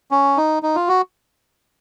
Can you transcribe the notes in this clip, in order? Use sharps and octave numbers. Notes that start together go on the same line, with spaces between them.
C#4
D#4
D#4
F4
F#4